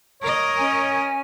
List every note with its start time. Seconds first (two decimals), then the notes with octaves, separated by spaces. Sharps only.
0.22 A#4 C#5 D#5
0.58 C#4 G#5